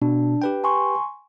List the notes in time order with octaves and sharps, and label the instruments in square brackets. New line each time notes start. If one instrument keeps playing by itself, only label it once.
[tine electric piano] B2 [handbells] D4
[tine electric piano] G4 B4 G5
[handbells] G#5 C6 C#6